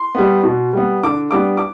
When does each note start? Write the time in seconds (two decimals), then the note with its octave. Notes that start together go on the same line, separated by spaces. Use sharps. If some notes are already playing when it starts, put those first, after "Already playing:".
Already playing: C6
0.15 G3 B3
0.43 B2
0.73 G3 B3
1.03 D3 D6
1.31 G3 B3 D4 D6
1.57 D6